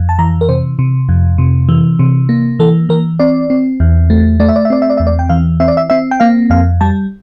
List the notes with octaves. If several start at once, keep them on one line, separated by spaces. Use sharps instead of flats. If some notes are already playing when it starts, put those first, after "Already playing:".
Already playing: F2
A5
E3 A#5
A#4
C3 C5
C3
F2
C3
E3
C3
A#3
E3 A4
E3 A#4
C4 D5
C4
E2
A3
A3 D5
E5
D5
E5
C4 D5
E5
D5
E2 E5
D5
G5
E3 F5
C4 E5
D5
E5
C4 E5
G5
A#3 F5
F2 F5
G3 A5